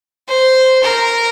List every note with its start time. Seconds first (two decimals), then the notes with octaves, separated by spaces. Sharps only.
0.28 C5
0.83 A#4